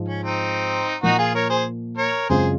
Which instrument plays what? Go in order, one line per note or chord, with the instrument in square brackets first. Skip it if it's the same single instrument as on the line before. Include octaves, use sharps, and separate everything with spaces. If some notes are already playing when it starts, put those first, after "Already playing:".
Already playing: [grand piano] G#2 F3 G#3
[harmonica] C#4
C4 D#4
[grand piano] A#2 F3 A#3 [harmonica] D#4 F#4
[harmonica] F4 G#4
A#4 C#5
G#4 C5
A#4 C#5
[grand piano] F#2 C#3 G#3 C4 F4 [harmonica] G#4 C5